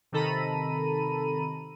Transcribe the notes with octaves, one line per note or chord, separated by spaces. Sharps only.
C3 D#3 A4 A#5 B5 D#7